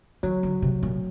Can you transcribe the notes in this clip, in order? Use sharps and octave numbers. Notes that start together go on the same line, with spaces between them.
D#3 F#3
D3
C3
A#2